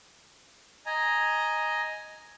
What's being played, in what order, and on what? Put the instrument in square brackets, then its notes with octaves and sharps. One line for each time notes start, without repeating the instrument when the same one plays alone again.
[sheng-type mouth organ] D#5 G#5 A#5